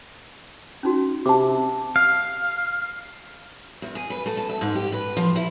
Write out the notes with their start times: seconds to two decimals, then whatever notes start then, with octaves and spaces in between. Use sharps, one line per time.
0.83 C#4 D#4 F#4
1.26 C3 A5 D6
1.96 F5
3.82 E2
3.95 G#4
4.10 B4
4.26 A3
4.37 A5
4.49 E5
4.61 G#2
4.75 G4
4.92 B4
5.17 F3
5.36 E4